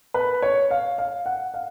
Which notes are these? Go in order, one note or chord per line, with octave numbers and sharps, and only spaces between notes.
B4
C#5
F5
F5
F#5
F5